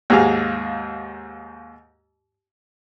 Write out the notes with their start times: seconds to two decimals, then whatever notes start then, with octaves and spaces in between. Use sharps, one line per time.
0.10 D#2 G#2 F#4 G#4 F5